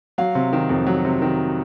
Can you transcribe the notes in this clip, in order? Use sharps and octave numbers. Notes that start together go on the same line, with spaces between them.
F#3 F5
C3
D#3
F2
F#3
C3
D#3